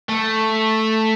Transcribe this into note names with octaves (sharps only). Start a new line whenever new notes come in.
A3